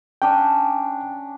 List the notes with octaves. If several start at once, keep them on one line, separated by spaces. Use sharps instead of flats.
C#4 D4 G5